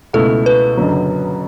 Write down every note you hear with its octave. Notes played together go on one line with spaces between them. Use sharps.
C#2 B2 A3 E4 A4
B4
F#1 F#2 D3 F#3